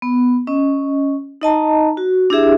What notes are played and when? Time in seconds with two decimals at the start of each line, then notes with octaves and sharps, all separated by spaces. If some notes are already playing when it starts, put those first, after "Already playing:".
0.02 B3
0.47 C#4 D#5
1.42 D#4 D#5 A5 A#5
1.97 F#4
2.30 D4 E4 G4 G#4 E5